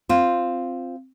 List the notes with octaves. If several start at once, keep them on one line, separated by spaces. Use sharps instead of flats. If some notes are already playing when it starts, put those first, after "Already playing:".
C4 F4